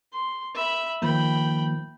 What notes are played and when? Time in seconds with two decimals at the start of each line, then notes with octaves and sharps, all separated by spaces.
0.13 C6
0.55 E5 B5
1.02 D#3 F3 A#3 G5 B5